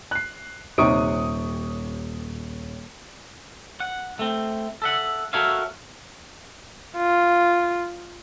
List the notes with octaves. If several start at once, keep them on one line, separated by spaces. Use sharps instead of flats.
F#6 C7
D#1 C3 D#4 C#5 C#6 D#6 D7
F#5
A3 C4
A4 E5 F#5
F#4 A4 A#4 C#5 E5 F5
F4